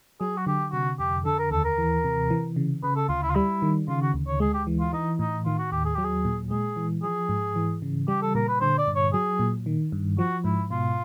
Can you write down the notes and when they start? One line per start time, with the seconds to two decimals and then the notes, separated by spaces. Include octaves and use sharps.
0.20 F#3 G#4
0.37 F#4
0.47 D3 G4
0.72 C3 F#4
0.99 F2 G4
1.25 D3 A4
1.39 A#4
1.51 D#2 A4
1.64 A#4
1.78 E3
2.04 C3
2.30 E3
2.56 C#3
2.83 C#3 B4
2.96 A4
3.09 D2 F4
3.23 E4
3.30 F4
3.35 G3 E4
3.62 D#3
3.88 C#3 F4
4.02 F#4
4.14 D2
4.27 C#5
4.40 G#3 G#4
4.54 G4
4.67 E3
4.80 F4
4.93 E3 D#4
5.19 A2 D#4
5.45 D#3 F4
5.58 F#4
5.72 D#2 G4
5.85 G#4
5.95 F#3 G4
6.04 G#4
6.25 A#2
6.50 G#3 G#4
6.76 E3
7.03 F3 G#4
7.29 G#2
7.56 E3
7.82 C#3
8.08 G3 G4
8.22 A4
8.35 A#2 A#4
8.48 B4
8.61 D3 C5
8.78 D5
8.87 G2
8.96 C#5
9.13 F#3 G#4
9.39 A#2
9.66 D#3
9.92 G2
10.19 F3 F#4
10.44 G#2 E4
10.70 B2 F4